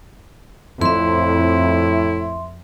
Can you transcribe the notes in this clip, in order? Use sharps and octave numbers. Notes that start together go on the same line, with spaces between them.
F2 A2 E4 E5 C6